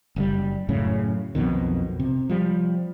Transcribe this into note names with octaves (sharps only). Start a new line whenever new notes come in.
F#1 A2 G3
F#2 A2 C#3
B1 F2 B2 D#3
C3
F3 G3